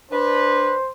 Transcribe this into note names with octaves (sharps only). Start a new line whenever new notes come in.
D4 B4 C5